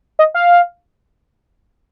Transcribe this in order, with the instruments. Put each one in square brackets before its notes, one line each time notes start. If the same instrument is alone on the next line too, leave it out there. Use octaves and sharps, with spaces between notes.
[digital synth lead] D#5
F5